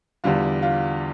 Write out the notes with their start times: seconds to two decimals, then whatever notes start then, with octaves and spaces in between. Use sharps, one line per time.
0.24 E2 D3 G3 F4
0.62 F4